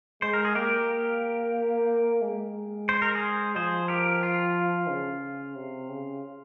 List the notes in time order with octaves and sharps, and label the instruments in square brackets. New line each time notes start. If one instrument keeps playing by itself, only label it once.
[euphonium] G#3 [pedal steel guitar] C5
[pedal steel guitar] A#4
G#4
[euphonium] A#3 [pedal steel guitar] G4 A#4
[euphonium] G#3
[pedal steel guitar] C5
A#4
G#4 C5
[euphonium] F3 [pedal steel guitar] G#4 C5
[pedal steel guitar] G4 A#4
F4
[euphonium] C#3
C3
C#3